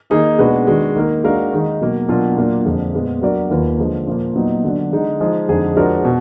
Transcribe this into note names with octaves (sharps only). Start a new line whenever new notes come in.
D#3 A#3 D#4 G#4
B2 G#3 D4 F#4 B4
D#3 G#3 D4 F#4
D#3 A#3 D#4 A#4
G#3 D4 F#4 A#4 F5
D#3 G#3 D#4
B2 F#3 A#3
B2 F#3 A#3 D4 F4
A#2 F#3 A#3 D4 F4
F2 D3 G#3
A#2 G#3 B3
F#3 D4 F#4 A#4 D5
D#2 D#3 A#3 F4 B4
D3 F3 G#3
A#2 F3 A#3
A#2 F#3 B3 D#4
D3 F#3 D4
D3 G#3 D#4
F3 G#3 D#4 G#4
F2 D3 G#3 D#4 G#4
F3 G#3 D4 F#4 A#4
B2